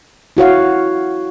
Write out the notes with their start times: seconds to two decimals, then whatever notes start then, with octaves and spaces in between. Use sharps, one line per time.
0.37 E4 F#4 C#5 F5